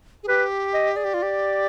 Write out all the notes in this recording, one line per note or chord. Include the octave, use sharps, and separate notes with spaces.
G#4
G4 B4
D#5
G#4 D5
G4
F4
G4